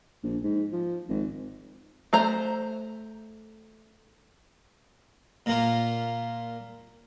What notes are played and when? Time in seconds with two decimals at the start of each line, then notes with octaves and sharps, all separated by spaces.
0.24 A#1
0.44 G#2
0.73 F3
1.09 G#1
2.13 A3 C5 A#5
5.46 A#2 A#3 F4